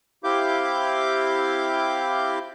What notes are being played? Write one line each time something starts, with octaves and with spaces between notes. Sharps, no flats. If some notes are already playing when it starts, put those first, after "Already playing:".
C4 E4 G4 F5 D6 G6